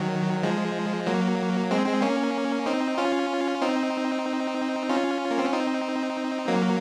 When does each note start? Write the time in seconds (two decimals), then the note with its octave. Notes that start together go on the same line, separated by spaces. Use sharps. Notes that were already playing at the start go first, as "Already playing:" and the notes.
Already playing: D#3 F#3
0.43 F3 G#3
1.07 F#3 A#3
1.71 G#3 C4
1.86 G#3 C4
2.02 A#3 C#4
2.66 C4 D#4
2.98 C#4 F4
3.61 C4 D#4
4.89 C#4 F4
5.31 A#3
5.39 C4
5.45 C#4
5.53 C4 D#4
6.48 F#3 A#3